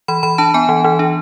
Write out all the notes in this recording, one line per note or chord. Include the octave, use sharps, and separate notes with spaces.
E3 B5
E3 B5
D4 A5
B3 G#5
E3
E3
D4